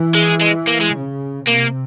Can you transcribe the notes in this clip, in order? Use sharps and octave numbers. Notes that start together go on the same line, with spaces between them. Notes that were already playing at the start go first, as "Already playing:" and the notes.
Already playing: E3
G#3
G#3
A#3
G#3
C#3
C3 A#3